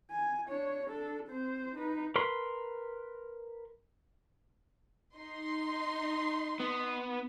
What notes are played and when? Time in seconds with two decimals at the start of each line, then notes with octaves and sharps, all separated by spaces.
0.12 G#5
0.48 D4 C#5
0.88 D4 A4
1.28 C4 C5
1.75 D#4 B4
2.16 A#4 B4 B5 C6
5.16 D#4 C6
6.60 B3